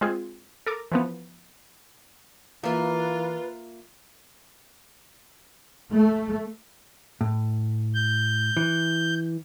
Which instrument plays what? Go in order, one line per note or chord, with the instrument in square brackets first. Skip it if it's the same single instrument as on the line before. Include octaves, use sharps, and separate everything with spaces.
[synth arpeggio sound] G#3 C4 F4 G#4
A4 A#4 D6
E3 F3 B3
[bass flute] E3 [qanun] A#3 E5 [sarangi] F4 [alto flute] B4
[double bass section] A3
[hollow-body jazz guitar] A2
[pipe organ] G6
[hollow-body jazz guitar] E3